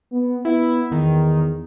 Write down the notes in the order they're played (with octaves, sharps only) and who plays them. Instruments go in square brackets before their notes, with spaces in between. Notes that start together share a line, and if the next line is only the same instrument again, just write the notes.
[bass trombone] B3
[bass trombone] B3 [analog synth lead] E4
[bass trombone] E2 [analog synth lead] D#3